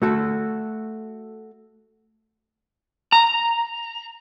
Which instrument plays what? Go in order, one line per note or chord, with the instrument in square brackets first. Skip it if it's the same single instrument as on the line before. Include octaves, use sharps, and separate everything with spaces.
[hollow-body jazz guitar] A3 F#4 A4
[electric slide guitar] A#5